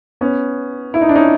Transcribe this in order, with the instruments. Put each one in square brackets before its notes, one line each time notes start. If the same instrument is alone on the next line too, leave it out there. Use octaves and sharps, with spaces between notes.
[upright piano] B3 C#4
E4
D#4
D4
C#4 D#4